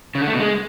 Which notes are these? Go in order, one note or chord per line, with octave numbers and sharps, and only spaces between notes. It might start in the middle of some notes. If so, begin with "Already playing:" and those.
C#3
D3
A3
B2
G#3